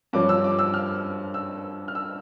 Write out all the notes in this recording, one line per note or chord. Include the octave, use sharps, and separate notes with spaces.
G2 F3 C#4 D6
E6
D6
E6
F6
E6
F6
E6